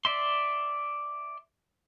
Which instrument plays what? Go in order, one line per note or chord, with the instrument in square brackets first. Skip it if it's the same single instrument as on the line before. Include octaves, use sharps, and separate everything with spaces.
[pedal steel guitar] D5 E5 C6